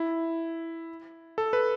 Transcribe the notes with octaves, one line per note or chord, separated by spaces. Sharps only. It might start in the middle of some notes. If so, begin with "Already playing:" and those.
Already playing: E4
A4
B4